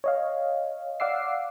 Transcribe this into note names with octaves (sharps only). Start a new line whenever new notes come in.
C#5 D#5 F5
D5 F5 F#5 D6 E6 C7